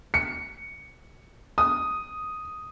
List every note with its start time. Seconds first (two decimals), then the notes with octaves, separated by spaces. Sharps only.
0.14 C#7
1.58 D#6